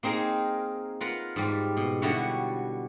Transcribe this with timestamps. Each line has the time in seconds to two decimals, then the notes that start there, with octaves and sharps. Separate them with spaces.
0.03 A#3 C4 D#4 G#4 A#4
1.01 F4 A#4 B4 F#5
1.36 G#2 G3
1.77 B2
2.02 D3 G3 B3 E4 F#4 C#5